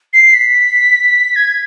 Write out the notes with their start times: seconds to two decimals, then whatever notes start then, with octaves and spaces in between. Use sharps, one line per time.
0.13 C7
0.33 B6
1.36 G#6